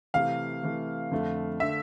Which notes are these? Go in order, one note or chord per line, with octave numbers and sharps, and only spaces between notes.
C3 E3 A3 F5
C3 E3 A3
F2 D3 A3
D3 A3 E5